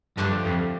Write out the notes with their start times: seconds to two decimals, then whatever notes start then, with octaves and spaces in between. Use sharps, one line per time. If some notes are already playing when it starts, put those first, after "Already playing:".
0.17 G2 D3 F3 A3 D4 G4
0.45 F2